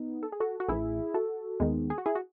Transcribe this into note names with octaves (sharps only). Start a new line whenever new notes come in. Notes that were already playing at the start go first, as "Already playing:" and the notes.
Already playing: B3 D#4
A4
G#4
F#4 A4
F#4
A1 A2 E3 E4 G#4
F#4 A4
D#2 D#3 G#3 B3
G#4
F#4
E4 G#4
F#4